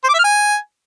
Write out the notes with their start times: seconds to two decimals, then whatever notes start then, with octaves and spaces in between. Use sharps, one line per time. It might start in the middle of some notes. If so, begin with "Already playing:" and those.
0.04 C5
0.09 D6
0.14 E5
0.19 F6
0.24 G#5